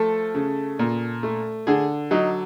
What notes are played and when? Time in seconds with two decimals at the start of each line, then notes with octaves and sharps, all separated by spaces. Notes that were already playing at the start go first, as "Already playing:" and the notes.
Already playing: F3 A3 A4
0.35 C#3
0.79 A#2
1.23 A3
1.67 D3 G#4
2.11 F#3 D#4